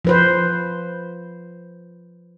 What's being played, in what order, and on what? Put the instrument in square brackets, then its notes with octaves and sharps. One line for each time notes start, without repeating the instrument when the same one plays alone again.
[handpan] F3 B4 C5